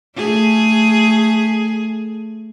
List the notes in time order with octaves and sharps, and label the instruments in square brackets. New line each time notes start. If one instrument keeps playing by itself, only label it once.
[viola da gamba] A3 G#4